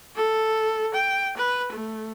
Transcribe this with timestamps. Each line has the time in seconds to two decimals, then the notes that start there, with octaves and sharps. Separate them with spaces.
0.16 A4
0.94 G5
1.37 B4
1.72 A3